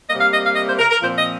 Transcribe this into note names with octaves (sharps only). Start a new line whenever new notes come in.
C3 G3 A#3 D#5
F5
D#5
F5
D#5
C5
A#4
A#4
A#2 F3 C4 C5
D#5